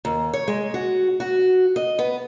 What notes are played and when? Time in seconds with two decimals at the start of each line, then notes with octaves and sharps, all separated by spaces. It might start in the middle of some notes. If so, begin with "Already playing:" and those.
0.05 D#2
0.34 C#5
0.48 G#3
0.74 F#4
1.20 F#4
1.76 D#5
1.99 B3